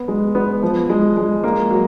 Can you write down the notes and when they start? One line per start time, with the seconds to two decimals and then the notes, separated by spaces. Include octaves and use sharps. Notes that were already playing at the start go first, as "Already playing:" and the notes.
Already playing: B3
0.08 G#3
0.35 B3
0.62 F3
0.89 G#3
1.17 G#3
1.44 A#3
1.71 F#3